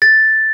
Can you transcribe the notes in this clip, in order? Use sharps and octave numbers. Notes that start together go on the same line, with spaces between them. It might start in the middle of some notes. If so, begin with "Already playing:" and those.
A6